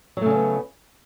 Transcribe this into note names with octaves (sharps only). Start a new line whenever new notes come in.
C#3 F#3 A3 B3 C#4